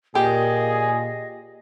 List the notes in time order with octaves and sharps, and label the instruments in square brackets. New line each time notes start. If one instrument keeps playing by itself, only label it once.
[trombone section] A#2 [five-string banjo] G4 [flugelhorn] G#4 [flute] D#5